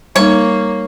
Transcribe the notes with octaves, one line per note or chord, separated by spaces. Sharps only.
G3 A#3 D#4 C#5